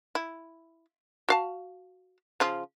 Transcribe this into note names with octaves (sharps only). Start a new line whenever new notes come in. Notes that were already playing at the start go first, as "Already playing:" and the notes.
E4
F#4 F5 A5
C#3 F3 F4